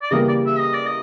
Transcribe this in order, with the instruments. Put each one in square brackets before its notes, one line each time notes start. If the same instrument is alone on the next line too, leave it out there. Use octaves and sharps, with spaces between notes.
[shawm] D5
[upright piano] C#3 E3 G3 A#3 [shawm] D#5
[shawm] D5
E5
D#5
D5
D#5